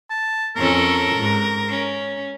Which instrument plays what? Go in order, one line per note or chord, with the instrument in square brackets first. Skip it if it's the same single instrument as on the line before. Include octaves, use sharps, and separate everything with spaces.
[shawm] A5
[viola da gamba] F2 C#4 A4 [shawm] A#4
[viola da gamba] G#2
C#4